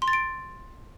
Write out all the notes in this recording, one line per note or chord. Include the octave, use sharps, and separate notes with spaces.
C6
A6
D7